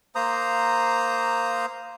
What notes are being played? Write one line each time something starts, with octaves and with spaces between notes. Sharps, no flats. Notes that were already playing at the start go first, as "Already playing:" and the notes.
A#3 C5 A#5 D#6